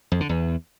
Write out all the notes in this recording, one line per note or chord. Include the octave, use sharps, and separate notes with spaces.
F2
D3
E2